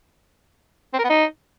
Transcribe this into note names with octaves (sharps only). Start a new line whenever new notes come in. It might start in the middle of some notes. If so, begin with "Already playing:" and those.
C4
A#4
B3
D#4